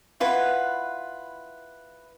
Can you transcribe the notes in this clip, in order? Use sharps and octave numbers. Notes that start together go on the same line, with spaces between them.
E4 F4 B4 F#5